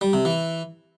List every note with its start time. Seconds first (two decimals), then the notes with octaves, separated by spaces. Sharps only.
0.01 G3
0.13 C3
0.25 E3